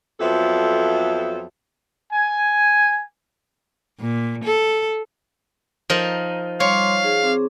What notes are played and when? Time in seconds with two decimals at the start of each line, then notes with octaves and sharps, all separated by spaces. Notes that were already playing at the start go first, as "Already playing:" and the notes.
0.20 F2 F3 F#3 B3 A4 E5
2.13 G#5
4.01 A#2
4.44 A4
5.90 F3 D#4 A#4
6.60 G3 C#5 F5 C6 D6
7.04 D#4 G#4
7.23 C4 G#4 D6